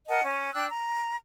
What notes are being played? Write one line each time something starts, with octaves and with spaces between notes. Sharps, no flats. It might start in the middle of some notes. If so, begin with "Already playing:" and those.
A#4 D#5 F#5 A5
C#4
D4 G5 E6 F#6
A#5